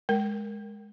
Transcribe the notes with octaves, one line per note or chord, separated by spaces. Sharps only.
G#3 A#4